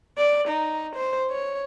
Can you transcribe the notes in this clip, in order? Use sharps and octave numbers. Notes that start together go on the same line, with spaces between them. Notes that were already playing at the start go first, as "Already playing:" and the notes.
D5
D#4
C5
C#5